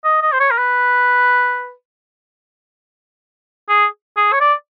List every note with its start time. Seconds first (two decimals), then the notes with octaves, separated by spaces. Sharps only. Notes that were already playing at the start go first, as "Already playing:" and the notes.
0.04 D#5
0.22 D#5
0.32 C5
0.40 C#5
0.51 A#4
0.58 B4
3.69 G#4
4.17 G#4
4.33 C#5
4.41 D5